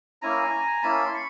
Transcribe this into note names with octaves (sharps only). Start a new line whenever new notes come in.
A#3 C#4 E4 G#5 A#5
A#3 C#4 E4 A5 B5
C6
B5 C#6